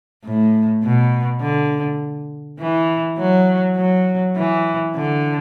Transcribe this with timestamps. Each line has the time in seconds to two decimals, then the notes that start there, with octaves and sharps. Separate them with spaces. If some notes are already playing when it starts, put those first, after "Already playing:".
0.24 A2
0.83 B2
1.42 D3
2.59 E3
3.18 F#3
3.77 F#3
4.37 E3
4.95 D3